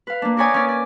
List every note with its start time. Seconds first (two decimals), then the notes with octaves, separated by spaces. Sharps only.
0.07 B4 F5
0.22 A#3 D4
0.37 A#4 B4 C#5 D5 G#5 D#6
0.54 C#4 D5
0.68 D5